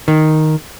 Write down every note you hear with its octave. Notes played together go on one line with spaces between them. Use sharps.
D#3